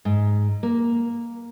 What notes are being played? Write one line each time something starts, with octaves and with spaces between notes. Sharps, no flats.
G#2
A#3